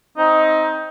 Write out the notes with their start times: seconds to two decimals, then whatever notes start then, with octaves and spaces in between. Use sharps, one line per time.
0.17 C4 D#4